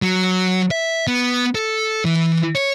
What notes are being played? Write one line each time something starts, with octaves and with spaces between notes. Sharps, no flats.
F#3
E5
B3
A4
E3
C#5